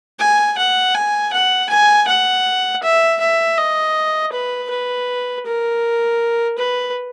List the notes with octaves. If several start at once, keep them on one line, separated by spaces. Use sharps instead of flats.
G#5
F#5
G#5
F#5
G#5
F#5
E5
E5
D#5
B4
B4
A#4
B4